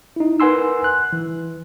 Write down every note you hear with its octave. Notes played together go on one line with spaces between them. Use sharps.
D#4 E4
A#4 B4 F#5 G#5 C6 E6
F#6
E3